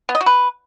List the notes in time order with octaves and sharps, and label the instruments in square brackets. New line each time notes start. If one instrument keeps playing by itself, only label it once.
[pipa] B3
D#5
F#4
B4